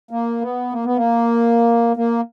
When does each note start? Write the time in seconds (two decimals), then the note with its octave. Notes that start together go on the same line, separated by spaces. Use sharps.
0.11 A#3
0.41 B3
0.73 A#3
0.85 B3
0.96 A#3
1.97 A#3